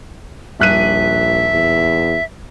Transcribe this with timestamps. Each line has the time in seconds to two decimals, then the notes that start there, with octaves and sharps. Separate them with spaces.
0.60 D#1 A#1 E5 F#6 D#7
1.53 E2